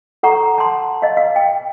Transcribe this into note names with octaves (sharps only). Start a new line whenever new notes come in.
A4 F#5 A#5 C#6
A5 C6
D#5 F5
F5
G5